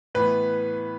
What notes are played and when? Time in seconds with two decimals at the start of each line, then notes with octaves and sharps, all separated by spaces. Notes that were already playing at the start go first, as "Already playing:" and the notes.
0.15 A2 E3 B3 B4